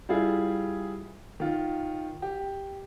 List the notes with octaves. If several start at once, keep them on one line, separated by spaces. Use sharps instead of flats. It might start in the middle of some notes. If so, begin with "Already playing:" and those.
G3 E4 F4 G#4
D#3 F4
G4